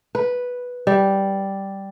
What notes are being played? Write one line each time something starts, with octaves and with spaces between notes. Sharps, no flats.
B4
G3